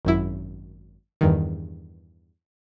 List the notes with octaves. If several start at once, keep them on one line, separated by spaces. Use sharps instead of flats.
G#1 F#2 E4
E2 G2 D#3